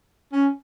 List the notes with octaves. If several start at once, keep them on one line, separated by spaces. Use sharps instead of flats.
C#4